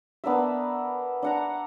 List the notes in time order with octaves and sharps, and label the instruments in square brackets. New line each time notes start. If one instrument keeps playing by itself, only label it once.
[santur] B3 D4 A#4 E5
D4 F#5 A#5